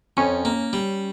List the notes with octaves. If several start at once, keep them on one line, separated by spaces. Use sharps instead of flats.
F2 C#4
A#3
G3